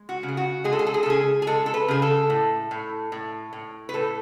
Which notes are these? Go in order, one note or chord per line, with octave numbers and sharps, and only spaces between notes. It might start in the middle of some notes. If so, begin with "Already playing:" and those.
Already playing: G#3
F#4
C#3
G#4
F#4
G#3 G#4
A4
G#4
A4
G#4
A4
C#3 G#4
G#4
G#3 A4
A4
B4
C#3 G#4
A4
A2
A2
A2
A2
B4
A2 A4